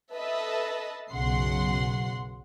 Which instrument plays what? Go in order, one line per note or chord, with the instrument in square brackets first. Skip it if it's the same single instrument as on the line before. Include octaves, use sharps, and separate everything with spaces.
[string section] A4 B4 D#5 E5 A5
B1 F#2 C#3 F#5 C6